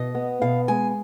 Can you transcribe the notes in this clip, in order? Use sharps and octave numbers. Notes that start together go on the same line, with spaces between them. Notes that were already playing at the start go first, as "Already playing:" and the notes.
Already playing: B2 D#5
B3
B2 F5
G#3 G#5